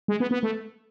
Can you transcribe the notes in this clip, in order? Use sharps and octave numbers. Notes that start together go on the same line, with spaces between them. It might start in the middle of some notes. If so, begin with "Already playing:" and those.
G#3
B3
B3
A3